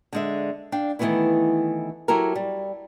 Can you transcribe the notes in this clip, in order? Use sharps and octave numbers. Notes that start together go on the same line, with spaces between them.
D3 G#3 E5
D4 F5 G5
D#3 E3 G#3 A3 B3 E4
F#3 E4 G4 A4 A#4
G3